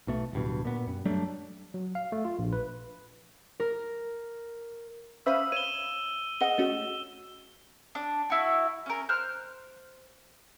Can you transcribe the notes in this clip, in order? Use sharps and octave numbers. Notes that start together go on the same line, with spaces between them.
B1 B2 A3
D1 G2 B2
A#2 B3
F#2
F#3 G3 A3 D4
F#3
F5
A3
F4
A#1
B4
A#4
C#4 C5 E5 F5 B5 D#6 E6
C#5 D#7 E7 G7
G#4 D#5 F#5 G7
A3 C#4 F#4
D4
E4 F#4
C#4 A#4
C5 F6 F#6